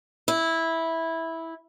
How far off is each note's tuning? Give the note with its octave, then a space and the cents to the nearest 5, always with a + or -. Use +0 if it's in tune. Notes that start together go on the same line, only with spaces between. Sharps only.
E4 -10